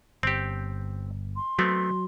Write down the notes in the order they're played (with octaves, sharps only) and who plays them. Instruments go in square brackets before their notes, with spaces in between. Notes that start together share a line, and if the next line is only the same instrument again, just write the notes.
[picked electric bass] G1 [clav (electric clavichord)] C4 G4
[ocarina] C6
[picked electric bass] F#3 [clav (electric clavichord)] A3 B3 C4